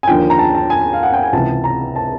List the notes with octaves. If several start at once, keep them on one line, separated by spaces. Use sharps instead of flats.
G#5
D#2 D3 F3 G5
A#5
A5
A5
G#5
F5
F#5
G5
G#5
C#2 C3 E3 A5
A#5
A5